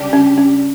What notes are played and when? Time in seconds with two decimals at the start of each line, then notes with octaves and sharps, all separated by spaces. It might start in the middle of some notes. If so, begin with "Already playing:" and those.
Already playing: C#3 G3 D4 G4
0.13 C#4
0.38 C#4